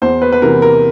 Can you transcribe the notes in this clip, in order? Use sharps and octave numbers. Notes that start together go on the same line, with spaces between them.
E2 C5
B4
B4
C3 E3 A#4
A#4